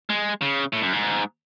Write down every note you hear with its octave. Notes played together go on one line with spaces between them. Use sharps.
G#3
C#3
A2
F#2
G#2